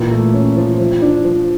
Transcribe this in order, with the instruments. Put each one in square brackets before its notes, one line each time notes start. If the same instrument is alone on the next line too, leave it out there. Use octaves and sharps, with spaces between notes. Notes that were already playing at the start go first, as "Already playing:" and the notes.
Already playing: [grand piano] A#2 E3
A3
C#4
F3
F3
D4
F3